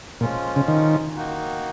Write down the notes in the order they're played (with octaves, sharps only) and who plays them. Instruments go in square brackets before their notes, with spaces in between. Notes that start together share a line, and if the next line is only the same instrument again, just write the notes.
[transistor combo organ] A#2 [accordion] F3 G#3 C#4 F4
[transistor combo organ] C#3
D#3
[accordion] D#3 A#3 D#4 F#4